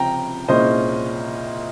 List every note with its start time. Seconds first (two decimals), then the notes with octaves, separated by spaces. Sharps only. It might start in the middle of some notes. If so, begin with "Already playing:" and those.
Already playing: C#2 C3 F3 G5 A#5
0.48 C2 A#2 G#3 C#4 F4 C5 D#5